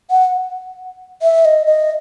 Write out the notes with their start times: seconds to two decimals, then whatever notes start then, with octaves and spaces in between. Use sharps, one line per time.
0.11 F#5
1.22 E5
1.45 D#5
1.67 D#5